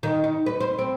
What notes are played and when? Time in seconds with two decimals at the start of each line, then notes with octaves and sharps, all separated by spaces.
0.03 D#3
0.24 D#4
0.46 B4
0.60 C5
0.79 C4